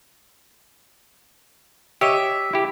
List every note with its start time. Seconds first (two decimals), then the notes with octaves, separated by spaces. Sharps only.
2.01 G4 C#5 D#5 E5
2.53 E4 G4